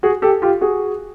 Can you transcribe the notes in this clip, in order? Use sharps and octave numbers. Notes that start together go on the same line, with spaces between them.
F#4 G#4
G4 A4
F4 G4
F#4 G#4